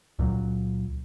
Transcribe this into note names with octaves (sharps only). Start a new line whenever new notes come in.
C#2 A#2 F#3